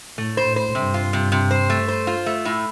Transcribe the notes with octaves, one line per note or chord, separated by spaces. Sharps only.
A2 A3
C5
A2
C5
G2 C3
F4
C3
C3
C5
A3
C5
F4
A3
A2